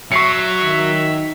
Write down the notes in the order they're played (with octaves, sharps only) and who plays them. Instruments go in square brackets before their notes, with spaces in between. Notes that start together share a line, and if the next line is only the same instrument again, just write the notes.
[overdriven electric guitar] F#3 [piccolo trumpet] E5 [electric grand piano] C#6 C7 C#7
[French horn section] D#3 [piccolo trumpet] E5